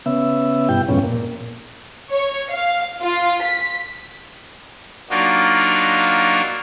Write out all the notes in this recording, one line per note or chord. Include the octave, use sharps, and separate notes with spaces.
C#3 B3 E5
G2 B2 E4 G5
F2 G#2 B2 C#4
A#2
C#5
F5
F4
B6
F#3 A#3 D4 D#4 F4 F#4